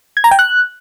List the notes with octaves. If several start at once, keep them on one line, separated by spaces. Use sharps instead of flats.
G#6
A#5
G5
F#6